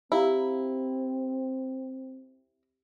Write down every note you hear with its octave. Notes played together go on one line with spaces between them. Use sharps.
C4 E4 G4 F5 A#5